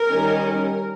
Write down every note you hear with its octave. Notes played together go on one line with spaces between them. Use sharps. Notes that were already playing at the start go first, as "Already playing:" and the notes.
Already playing: A#4
D#3 G3 C#4